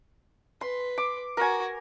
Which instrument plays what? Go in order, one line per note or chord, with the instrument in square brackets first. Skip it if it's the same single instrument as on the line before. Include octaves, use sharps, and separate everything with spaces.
[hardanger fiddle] B4 [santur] C6
[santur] D6
[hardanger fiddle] F#4 [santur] A#4 G#5